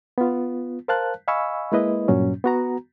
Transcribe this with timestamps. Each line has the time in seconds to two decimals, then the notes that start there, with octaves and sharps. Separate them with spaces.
0.18 B3 F4
0.88 A#4 C5 F5 A5 F#6
1.28 D#5 F5 G#5 B5 C#6 E6
1.72 G#3 A#3 E4 B4 D#5
2.08 G2 A#2 F#3 C#4
2.44 B3 F#4 A#5